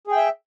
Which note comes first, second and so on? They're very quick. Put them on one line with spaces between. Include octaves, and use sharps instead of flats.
G#4 G5 E5